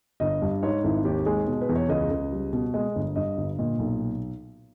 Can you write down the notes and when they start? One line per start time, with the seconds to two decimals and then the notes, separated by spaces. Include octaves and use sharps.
0.20 G1 D#5
0.42 G2
0.63 G#2 C#5
0.84 G#1 E4
1.05 D#2 G4
1.26 G#3 G#4
1.47 B2
1.61 B4
1.69 E2
1.76 C#5
1.89 C#2 D#5
2.11 C#2
2.32 G3
2.53 B2
2.74 G#3 D#5
2.96 G1
3.16 G2 D#5
3.37 G1
3.58 A#2 D#5
3.79 B1